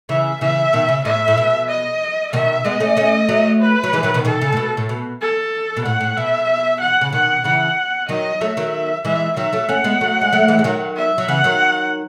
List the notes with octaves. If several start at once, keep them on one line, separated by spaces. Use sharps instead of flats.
C#3 E3 E5
C#3 E3 E5
B2 D#3
C#3
A2 E5
A2
B2
D#5
B2 D#3 E5
G#3 B3 D#5
A3 C#4
A3 C#4
F#3 A3
B4
F#3
E3 G#3
D#3 F#3
B2 D#3
B2 D#3 A4
C#3
A2
B2
A2
B2
A4
B2
A2 F#5
A2
B2 E5
F#5
C#3
B2 D#3 F#5
C#3 E3 F#5
D#3 F#3 D#5
F#3 A3 E5
D#3 F#3
E3 G#3 E5
D#3 F#3 E5
F#3 A3
A3 C#4 F#5
G#3 B3
F#3 A3
G#3
F#3 A3
E3 G#3
G#3
D#3 F#3
E5
F#3
C#3 E3 F#5
D#3 F#3